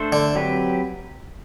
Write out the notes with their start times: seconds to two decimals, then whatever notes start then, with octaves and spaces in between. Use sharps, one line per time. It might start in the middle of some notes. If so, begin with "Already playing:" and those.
Already playing: A3 D4 A4 C5
0.12 D3
0.35 F#3 C4 G4 B4